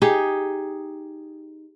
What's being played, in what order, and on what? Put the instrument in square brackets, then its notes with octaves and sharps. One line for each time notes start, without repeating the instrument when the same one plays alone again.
[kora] D#4 G4 G#4